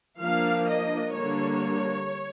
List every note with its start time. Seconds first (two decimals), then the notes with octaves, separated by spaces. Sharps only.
0.21 F3 A#3 D4 F5
0.68 D#5
1.14 D3 G3 A#3 D4 C#5